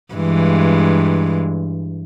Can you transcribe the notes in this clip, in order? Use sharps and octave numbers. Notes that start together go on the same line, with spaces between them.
G2 E3 G#3